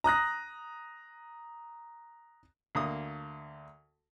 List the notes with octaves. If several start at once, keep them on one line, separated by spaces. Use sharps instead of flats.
A#5 D#6 F#6 A#6
D2 A#3 D#6